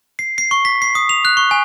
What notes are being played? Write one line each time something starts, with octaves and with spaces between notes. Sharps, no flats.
C7
C7
C#6
B6
C7
D#6
F7
F#6
C#6
G#5